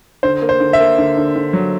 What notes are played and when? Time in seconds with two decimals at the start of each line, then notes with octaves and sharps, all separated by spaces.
0.23 D3 C5
0.42 A#3
0.49 C5
0.60 D3
0.73 E5
0.79 A#3
0.98 D3
1.17 D3
1.36 D3
1.53 F#3